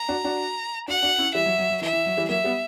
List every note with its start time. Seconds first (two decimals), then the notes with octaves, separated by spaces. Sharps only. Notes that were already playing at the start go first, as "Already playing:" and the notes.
Already playing: A#5
0.09 D4 F#4
0.24 D4 F#4
0.88 D4 F#4 F#5
1.02 D4 F#4
1.18 C#4 E4
1.34 E3 G3 E5
1.46 F#3
1.58 F#3
1.70 F#3
1.81 E3 E5
1.93 E3
2.06 F#3
2.17 E3 G3
2.29 F#3 A#3 E5
2.44 G3 B3